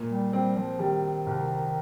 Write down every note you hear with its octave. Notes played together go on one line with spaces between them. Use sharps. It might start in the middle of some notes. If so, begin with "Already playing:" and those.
Already playing: A#2
G3
G3 C4
F3
D#3 G3
C2